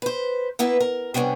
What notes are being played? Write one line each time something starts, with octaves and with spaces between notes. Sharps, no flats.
B4 C5
A#3 B3 E4 B4
A#4
C3 G3 B3 C#4 D4